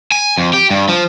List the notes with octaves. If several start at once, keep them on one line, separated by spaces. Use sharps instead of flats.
G#5
F2
G4
G2
F3